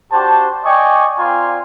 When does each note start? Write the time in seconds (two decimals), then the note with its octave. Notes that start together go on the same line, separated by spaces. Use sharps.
0.12 D4 F#4 G4 C5 A5
0.64 D5 D#5 G5 G#5 C#6
1.18 C4 F4 D5 G#5 A#5 C6